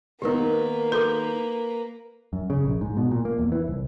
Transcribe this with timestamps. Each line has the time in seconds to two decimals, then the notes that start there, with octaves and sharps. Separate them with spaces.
0.22 D#3 A#3 B3 D#4 G4 A#4 B4
0.92 F#4 A4 A#4 D6
2.33 F#2
2.50 C#3
2.65 A#1
2.81 G#2
2.97 B2
3.11 A#2
3.25 A#3
3.39 E2
3.52 E3
3.68 C2